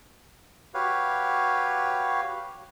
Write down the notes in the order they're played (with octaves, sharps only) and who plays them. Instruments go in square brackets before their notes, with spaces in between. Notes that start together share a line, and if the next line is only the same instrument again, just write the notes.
[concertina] F#4 G4 B4 C#5 F5